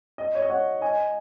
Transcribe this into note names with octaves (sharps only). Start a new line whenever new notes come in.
D#5
C#5
D#5
C#5 F#5
D#5 G#5